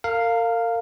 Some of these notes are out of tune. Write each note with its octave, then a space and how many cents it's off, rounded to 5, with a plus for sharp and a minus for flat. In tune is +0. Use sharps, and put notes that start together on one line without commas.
A#4 -35 F5 +0